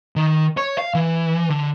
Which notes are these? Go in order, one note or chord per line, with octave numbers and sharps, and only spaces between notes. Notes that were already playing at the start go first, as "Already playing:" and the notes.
D#3
C#5
F5
E3
D3